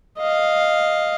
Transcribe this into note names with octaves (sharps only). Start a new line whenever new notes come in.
D#5 F5